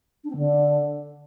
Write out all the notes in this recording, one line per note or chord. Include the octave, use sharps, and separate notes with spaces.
D4
C4
D3